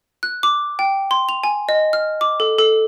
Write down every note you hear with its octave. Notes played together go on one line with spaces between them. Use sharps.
F#6
D6
G5
C6
F7
G#5
D#5
F6
D6
A4
A4